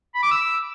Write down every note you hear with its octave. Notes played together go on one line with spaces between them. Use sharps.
B5
D6
E6